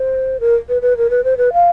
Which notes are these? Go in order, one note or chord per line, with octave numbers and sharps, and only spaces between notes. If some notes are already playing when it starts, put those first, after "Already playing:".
Already playing: C5
A#4
B4
B4
A#4
B4
C5
B4
F5